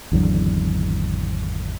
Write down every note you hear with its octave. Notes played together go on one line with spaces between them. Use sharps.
G#1 E2 D3 F#3